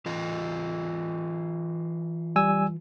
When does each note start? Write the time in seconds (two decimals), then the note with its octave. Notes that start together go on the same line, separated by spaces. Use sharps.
0.06 E3 F4 D#5
2.36 G3 G#5 E6